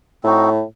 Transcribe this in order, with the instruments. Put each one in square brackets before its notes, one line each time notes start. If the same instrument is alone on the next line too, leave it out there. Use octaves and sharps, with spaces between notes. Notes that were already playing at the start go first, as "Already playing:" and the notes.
[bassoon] A2 [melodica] C4 D#4 F#4